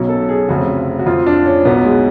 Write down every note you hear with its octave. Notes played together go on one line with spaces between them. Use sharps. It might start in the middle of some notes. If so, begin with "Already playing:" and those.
Already playing: B1 B2 F#3 C#4
A4
G#4
F1 F2 C#3 F#4
F#4
F2 F3 F4
D4
C#4
B1 B2 F#3 B3
G#3